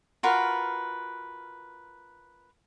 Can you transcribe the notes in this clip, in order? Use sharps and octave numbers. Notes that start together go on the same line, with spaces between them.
F4 F#4 A#4 B4